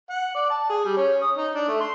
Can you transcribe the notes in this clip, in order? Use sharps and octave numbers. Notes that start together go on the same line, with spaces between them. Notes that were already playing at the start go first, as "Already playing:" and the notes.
F#5
D5
A5
G#4
G3
C#4
D#6
D#4
D4
A3
C6